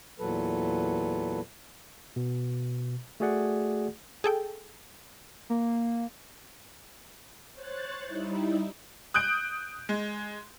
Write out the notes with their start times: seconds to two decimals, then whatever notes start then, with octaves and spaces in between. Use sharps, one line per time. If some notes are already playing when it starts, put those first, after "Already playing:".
0.19 E2 A#2 F#3 A4 B4
2.16 B2
3.20 A3 F#4 G#4 D5 F#5
4.24 G#4 A4 G5
5.50 A#3
7.53 C5 C#5 F#6 A6
8.04 G3 D#4 E4
9.14 D#6 F#6 G6 D7
9.89 G#3